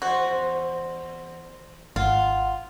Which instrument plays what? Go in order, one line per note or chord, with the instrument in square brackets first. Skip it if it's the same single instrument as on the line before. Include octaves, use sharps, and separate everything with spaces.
[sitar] E2 C5 [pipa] F#4
[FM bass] G#1 [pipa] F4 [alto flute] F#5